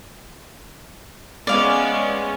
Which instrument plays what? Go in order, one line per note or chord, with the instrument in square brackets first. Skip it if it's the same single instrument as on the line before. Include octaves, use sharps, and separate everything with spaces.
[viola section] G#3 B3 C#4 [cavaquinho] D5 F5